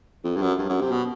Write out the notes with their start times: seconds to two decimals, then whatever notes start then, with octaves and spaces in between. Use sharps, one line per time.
0.24 F2
0.36 G2
0.42 F#2
0.59 G2
0.70 F#2
0.81 C3
0.91 B2